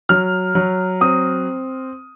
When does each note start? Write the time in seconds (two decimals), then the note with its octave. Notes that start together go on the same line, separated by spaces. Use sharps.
0.09 F#3 F6
0.55 F#3
1.01 C4 D#6